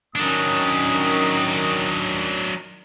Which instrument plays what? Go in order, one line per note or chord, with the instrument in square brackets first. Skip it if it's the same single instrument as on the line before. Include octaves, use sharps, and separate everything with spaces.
[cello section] D#3 C#4 [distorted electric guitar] F#3 D4 [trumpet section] D#6